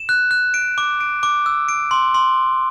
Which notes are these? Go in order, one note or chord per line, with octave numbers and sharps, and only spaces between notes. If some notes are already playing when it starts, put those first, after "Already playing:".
Already playing: E7
F#6
F#6
D7
D6
D7
D6
E6
D7
C6
C6